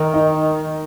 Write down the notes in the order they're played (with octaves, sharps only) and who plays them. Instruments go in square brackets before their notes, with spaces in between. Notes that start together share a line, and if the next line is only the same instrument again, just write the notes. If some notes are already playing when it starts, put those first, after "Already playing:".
Already playing: [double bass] D#3 [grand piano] A#4
[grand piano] D#4